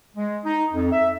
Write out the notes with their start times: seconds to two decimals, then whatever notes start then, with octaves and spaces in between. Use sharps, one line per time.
0.16 G#3
0.45 D#4
0.73 F2
0.92 E5